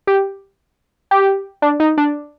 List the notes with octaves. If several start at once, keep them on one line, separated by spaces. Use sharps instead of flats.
G4
G4
D4
D#4
D4